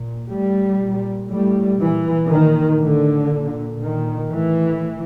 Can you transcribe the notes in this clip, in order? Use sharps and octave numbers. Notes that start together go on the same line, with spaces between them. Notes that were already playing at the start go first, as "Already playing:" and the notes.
Already playing: A#2
A2 G3
A#2
A2 G3
A#2 E3
A#2 D#3
A2 D3
A#2
A#2 D#3
A2 E3